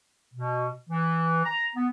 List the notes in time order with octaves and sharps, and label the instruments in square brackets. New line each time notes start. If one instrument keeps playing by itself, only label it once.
[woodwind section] B2
E3
A#5
B3